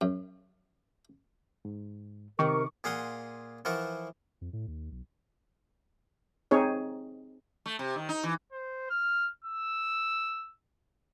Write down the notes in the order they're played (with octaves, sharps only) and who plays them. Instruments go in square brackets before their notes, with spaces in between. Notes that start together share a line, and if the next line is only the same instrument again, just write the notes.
[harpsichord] F#2
[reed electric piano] G#2
[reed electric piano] C3 [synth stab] D#3 [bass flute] A#4 [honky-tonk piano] C#6 D6
[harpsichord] A#2 G#4 F5 F#5 C6 D#6
E3 F3 F4 A#4 F#5 C#6
[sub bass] F2
A2
D#2
B1
[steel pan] C4 D#4 G#4 C#5
[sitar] A3
C3
D#3
D#4
E3
[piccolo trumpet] C5
F6
E6